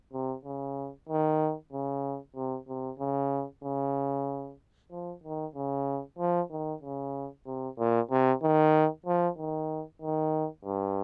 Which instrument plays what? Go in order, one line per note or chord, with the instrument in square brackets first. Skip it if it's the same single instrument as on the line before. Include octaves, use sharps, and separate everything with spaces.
[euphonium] C3
C#3
D#3
C#3
C3
C3
C#3
C#3
F3
D#3
C#3
F3
D#3
C#3
C3
A#2
C3
D#3
F3
D#3
D#3
G2